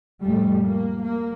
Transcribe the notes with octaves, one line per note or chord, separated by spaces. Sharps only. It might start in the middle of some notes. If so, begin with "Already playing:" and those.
F2 A2 G3 A3
A#3
A#3